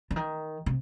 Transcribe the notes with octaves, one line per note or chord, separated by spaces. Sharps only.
D3
D#3
C3